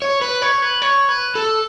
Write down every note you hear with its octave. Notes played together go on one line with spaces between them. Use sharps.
C#5
B4
C#5
B4
C#5
B4
A4